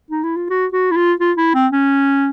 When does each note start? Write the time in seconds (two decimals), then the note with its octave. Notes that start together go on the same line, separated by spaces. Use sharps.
0.10 D#4
0.23 E4
0.37 F4
0.50 F#4
0.73 F#4
0.91 E4
0.96 F4
1.20 F4
1.37 E4
1.54 C4
1.72 C#4